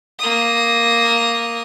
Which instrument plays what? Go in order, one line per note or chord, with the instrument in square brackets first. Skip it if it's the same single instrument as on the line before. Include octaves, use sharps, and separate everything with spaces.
[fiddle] A#3 D#6